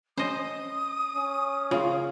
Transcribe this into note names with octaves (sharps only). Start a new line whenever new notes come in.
C#4 C5 D#5 D#6
C#4
C#3 F4 F5